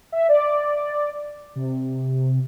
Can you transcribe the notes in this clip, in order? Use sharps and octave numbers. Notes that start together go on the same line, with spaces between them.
E5
D5
C3